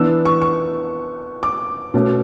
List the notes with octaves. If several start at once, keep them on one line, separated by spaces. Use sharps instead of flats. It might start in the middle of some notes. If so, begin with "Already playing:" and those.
Already playing: E3 B3 D4 E6
C#6
C#6
D6
B2 A3 C#4